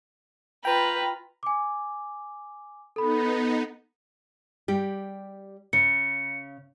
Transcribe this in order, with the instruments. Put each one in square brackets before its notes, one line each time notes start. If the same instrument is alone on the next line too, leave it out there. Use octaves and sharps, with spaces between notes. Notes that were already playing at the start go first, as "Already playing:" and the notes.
[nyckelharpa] F4 A#5 [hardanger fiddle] B4 [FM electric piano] G5 B5
[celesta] G#5 D6
[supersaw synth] B3 D#4 [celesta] A4 B5
[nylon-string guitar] G3 G4
[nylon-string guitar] C#3 [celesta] C#7